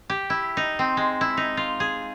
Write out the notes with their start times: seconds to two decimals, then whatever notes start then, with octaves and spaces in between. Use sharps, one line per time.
0.10 G4
0.30 E4
0.57 D#4
0.79 C4
0.97 G#3
1.21 E4
1.37 D#4
1.57 F4
1.80 G#4